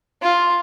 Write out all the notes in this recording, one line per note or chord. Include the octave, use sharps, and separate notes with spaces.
F4